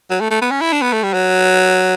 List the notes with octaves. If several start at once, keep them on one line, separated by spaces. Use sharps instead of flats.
F#3
A3
A3
B3
C#4
E4
D4
B3
A3
G3
F#3